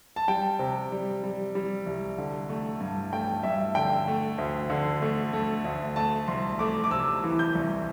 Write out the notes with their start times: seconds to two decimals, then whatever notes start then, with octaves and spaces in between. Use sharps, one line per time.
0.16 A5
0.28 G3 G5
0.59 C3
0.92 G3
1.24 G3
1.55 G3
1.86 C2
2.18 D3
2.50 A3
2.80 G2
3.13 A3 G5
3.43 G2 E5
3.75 D3 G5
4.08 A3
4.38 D2
4.70 D3
5.02 A3
5.33 A3
5.65 D2
5.96 A3 A5
6.28 C2 C6
6.59 A3 D6
6.84 D6
6.91 C3 E6
7.23 E3
7.39 G6
7.55 C2